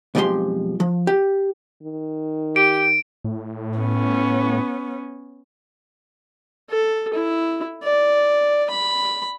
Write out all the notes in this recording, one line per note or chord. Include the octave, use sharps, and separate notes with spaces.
B1 F2 F3 G#3 G4 C6
F3
G4
D#3
G4 D7
A2
B3 C#4
A4
E4
D5
B5